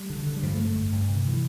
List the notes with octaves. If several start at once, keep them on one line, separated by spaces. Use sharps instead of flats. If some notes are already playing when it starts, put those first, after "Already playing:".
Already playing: G3
D3
D3
G3
G2 F3
A3
D3
A3
G2
G2
C3
D3
C3 E3